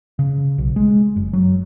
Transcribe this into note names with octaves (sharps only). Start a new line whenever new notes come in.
C#3
B1
G#3
F#1
F#3